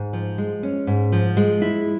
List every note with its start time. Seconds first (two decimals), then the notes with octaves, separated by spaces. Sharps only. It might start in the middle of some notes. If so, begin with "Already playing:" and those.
Already playing: G#2
0.13 F3
0.38 G#3
0.63 C#4
0.87 G#2
1.12 F3
1.37 G#3
1.62 E4